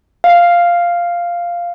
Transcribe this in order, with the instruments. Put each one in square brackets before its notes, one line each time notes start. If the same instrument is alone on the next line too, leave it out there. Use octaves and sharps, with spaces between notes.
[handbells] F5